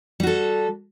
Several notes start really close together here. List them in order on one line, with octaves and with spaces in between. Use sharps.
G3 F#4 A4